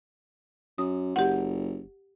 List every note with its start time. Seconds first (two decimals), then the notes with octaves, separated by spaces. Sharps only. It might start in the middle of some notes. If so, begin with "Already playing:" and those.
0.78 F#2 D#6
1.16 F#1 G4 F#5